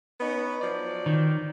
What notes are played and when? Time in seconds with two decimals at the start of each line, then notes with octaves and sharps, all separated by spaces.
0.20 B3 C#4 D#4
0.61 F3 F#3 D5
1.06 D#3